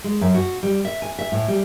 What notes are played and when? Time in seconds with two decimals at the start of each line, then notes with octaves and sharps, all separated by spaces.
0.04 G#3
0.21 F#2
0.34 F#4
0.63 G3
0.85 E5
1.02 G#5
1.19 E5
1.32 A2
1.48 G3